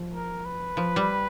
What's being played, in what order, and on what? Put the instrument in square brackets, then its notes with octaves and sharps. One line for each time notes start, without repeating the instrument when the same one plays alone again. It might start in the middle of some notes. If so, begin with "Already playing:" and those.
Already playing: [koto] F3
[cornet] A#4
B4
[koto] F3
G3